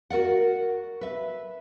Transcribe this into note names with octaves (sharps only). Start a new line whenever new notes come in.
F#4 A#4 D5 F#5
B4 E5